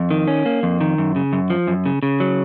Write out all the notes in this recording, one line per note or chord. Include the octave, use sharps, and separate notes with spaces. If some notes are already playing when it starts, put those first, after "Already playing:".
Already playing: F2
D#3
C#4
A#3
F2
D#3
F#2
C#3
F#2
F3
F#2
C#3
C#3
F#3